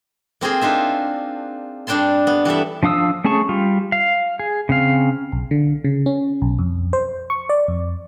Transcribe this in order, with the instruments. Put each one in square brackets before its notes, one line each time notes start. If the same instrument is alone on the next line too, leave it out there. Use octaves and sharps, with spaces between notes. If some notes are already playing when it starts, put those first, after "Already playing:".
[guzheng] A#3 C4 F4 G#4
D4 D#4 F4 E5
G2 G3 D4 G5 A5 C6
B3
E3 G3 A4 E5
[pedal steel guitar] F3 D4 F5 D#6 E6
A3 C#4 G#4 A5 C#6
G3 F4
F5
G#4
C#3 C4 F5
[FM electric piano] B1
D3
C#3
C#4
B1
F2
C5
C#6
D5
F2